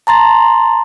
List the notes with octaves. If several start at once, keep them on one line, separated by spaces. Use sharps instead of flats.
A5 A#5 C6 A6